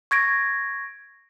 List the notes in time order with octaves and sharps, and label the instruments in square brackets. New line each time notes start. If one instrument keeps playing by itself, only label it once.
[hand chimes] C#6 G#6 A#6 D7